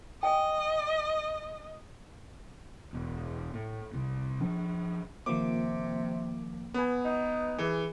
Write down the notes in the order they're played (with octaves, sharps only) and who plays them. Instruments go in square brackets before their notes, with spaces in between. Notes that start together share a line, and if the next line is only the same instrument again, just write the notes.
[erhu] D#5 [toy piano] G5 G#5
[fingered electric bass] E1
A2
C2
F3 D4
[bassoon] C3 [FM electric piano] D#3 F3 A#3 [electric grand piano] D6
[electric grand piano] B3 G#5 [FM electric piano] B4
[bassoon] D#4
[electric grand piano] E3 [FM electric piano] G#4